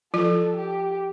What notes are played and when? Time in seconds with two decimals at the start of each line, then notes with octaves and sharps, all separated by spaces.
0.14 F3 F4 A4
0.56 G4